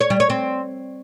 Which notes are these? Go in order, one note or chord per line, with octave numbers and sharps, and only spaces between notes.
C#5
G3
C#5
C4